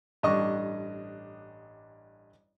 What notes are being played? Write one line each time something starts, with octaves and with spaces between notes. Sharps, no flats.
A1 G2 D4 D#5 C#6